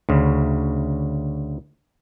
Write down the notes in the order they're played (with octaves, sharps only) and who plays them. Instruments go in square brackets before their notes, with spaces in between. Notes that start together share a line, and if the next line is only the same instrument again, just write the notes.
[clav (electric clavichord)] D2 C#3